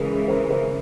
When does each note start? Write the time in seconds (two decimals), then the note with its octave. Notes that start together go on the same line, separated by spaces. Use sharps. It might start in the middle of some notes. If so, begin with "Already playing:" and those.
Already playing: C#3 E3 G#3 G#4 A#4
0.28 A#4 C5
0.50 A#4 C5